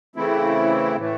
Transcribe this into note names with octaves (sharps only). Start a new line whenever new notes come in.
C#3 E3 A3 C4 E4
A2 E3 A3